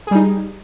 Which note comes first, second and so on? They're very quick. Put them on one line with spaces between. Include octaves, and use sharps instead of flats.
G#4 G3 D#4